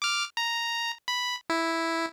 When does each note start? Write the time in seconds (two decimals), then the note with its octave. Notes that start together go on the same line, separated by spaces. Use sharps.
0.02 D6 F6
0.37 A#5
1.08 B5
1.50 E4